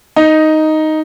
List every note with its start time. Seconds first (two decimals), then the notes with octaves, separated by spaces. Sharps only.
0.16 D#4